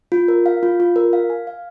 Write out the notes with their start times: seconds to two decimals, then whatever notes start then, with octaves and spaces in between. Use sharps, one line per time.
0.12 F4
0.28 A#4
0.46 F5
0.63 F4
0.80 F4
0.96 A#4
1.13 F5
1.30 G#5
1.47 F5